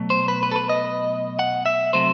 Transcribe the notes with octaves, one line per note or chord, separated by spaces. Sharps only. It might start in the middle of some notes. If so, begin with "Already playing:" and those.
Already playing: B2 F#3 A3
C5
B4
B4
A4
B4
D#5
F#5
E5
C3 F#3 A3 C5